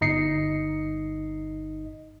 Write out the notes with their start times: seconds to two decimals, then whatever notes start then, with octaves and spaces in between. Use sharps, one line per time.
0.01 G1 D#4 D#5 C7 C#7